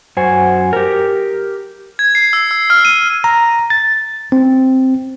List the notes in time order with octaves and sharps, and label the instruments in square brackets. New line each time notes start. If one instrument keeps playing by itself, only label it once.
[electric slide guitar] F#2 F#4 C5 G#5
G4 A#4
[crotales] G#6
C7
E6
E6
F6
D#7
[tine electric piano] A#5
A6
C4